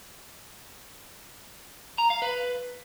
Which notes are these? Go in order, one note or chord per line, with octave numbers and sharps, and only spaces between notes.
A#5
F5
B4